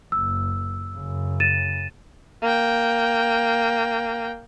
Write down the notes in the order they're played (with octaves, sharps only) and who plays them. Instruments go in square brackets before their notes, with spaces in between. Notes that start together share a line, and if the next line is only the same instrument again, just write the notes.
[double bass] F#1 [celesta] E6
[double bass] F#2 C#3
[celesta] A6 D#7 E7
[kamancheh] A#3 G5